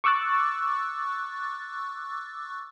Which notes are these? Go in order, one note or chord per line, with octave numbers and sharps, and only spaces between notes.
C#6 D6 E6 F#6 A6